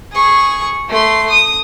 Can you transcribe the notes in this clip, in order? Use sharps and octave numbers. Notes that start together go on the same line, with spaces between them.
G#4 C#6
A3 C6
D#6